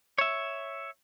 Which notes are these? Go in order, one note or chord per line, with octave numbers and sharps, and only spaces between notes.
C#5 E5